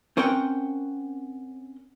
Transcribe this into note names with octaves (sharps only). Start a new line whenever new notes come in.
C4 C#4 A#4 F#5 G5